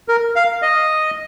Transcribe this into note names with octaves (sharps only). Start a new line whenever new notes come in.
A#4
F5
D#5